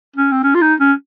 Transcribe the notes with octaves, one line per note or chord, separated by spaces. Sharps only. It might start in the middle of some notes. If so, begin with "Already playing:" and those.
C#4
C4
C#4
F4
D#4
C#4